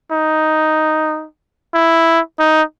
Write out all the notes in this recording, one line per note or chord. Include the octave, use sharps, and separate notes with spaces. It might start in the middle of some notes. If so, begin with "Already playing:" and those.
D#4
E4
D#4